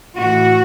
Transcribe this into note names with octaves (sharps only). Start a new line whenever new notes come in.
A2 E3 F#4